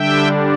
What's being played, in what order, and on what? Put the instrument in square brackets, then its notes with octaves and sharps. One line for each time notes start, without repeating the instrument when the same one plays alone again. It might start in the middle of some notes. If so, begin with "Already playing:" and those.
Already playing: [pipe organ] D3 G3 D4 E5 G5